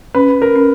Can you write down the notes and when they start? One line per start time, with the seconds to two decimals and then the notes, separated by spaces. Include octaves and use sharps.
0.15 C#4 B4
0.42 A#4
0.55 C#4